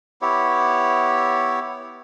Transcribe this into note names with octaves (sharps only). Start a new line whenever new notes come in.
B3 E4 G4 C#5